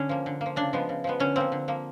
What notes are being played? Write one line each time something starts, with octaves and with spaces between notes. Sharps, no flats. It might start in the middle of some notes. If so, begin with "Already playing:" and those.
Already playing: D3 C#4
F3 A#3
D3
A#3
F3
C#3 D4
F3 G#3 B3
C#3
F3 G#3 B3
D3 C#4
F3 A#3 C4
D3
F3 A#3